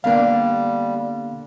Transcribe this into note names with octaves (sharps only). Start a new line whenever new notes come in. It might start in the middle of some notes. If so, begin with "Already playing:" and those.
D3 G3 A#3 B3 D4 F5